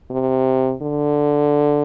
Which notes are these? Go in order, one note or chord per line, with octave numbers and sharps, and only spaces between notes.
C3
D3